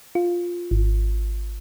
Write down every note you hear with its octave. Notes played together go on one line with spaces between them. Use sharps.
F4
G#1